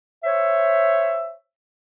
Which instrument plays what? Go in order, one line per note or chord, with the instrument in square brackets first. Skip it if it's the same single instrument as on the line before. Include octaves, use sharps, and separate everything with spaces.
[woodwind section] C5 C#5 E5